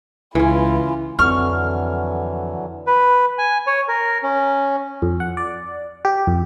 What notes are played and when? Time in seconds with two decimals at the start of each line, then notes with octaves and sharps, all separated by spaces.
0.35 C#2 E3 C#4 E4 F4
1.19 F2 D3 E3 F#3 C#6 F6
2.87 B4
3.38 G#5
3.67 C#5
3.88 A#4
4.23 C#4
5.02 F2
5.20 F#5
5.37 D5
6.05 G4
6.27 F2